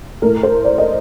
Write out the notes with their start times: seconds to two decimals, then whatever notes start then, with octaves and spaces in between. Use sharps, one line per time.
0.22 A2 A3 A#4
0.43 C5
0.64 D5
0.78 D#5